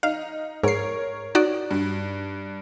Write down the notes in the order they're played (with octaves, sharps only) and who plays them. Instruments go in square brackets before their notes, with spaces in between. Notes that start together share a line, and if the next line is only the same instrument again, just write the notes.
[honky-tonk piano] D#4 [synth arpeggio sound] F5
[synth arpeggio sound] G#2 C7 [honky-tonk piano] A#4 C#5
[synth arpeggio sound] D#4 F#4 D5
[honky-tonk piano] G2